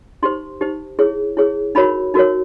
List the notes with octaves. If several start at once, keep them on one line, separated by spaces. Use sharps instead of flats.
D#4 G4 C5 C6
D#4 G4 C5
E4 G#4 C#5
E4 G#4 C#5
D#4 F#4 A#4 C#5 B5
D#4 F#4 A#4 C#5